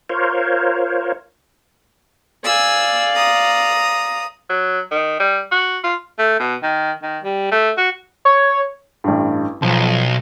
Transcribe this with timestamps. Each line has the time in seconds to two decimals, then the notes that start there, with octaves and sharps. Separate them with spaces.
0.10 F4 A#4 C5 C#5
2.44 D5 F5 G#5 E6
3.14 A#5 D#6
4.50 F#3
4.91 D#3
5.20 G3
5.52 F#4
5.84 F4
6.19 A3
6.40 B2
6.63 D#3
7.03 D#3
7.24 G3
7.52 A3
7.77 F#4
8.25 C#5
9.04 A1 G2
9.62 B1 F3